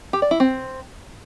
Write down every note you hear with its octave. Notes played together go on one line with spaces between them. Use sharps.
G4
D5
E4
C4